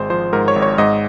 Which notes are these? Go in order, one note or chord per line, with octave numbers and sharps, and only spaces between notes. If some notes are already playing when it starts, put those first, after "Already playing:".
Already playing: G#1 G#3 C5
F3 C5
G#2 A#4
C#5
G#1
C#5
G#2 D#5